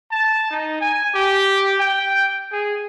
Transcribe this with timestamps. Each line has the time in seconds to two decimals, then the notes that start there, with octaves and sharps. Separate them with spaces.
0.11 A5
0.51 D#4
0.81 G#5
1.15 G4
1.80 G5
2.52 G#4